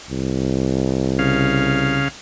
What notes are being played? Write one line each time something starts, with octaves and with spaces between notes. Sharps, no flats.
C2
C#3 F5